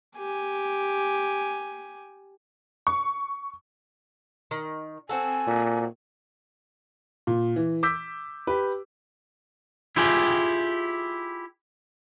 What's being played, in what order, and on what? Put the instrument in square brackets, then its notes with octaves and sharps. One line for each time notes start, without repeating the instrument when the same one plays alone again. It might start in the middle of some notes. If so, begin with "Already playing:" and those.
[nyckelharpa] G4 G#5
[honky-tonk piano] C#6
[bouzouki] D#3
[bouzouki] C4 F#4 A4 [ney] G#5
[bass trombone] A#2
[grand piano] A#2
E3
D6 E6 G6 B6
G4 B4
[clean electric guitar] E4 F4 G4 G#4 G5